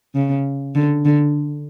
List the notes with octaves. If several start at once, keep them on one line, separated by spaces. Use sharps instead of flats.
C#3
D3
D3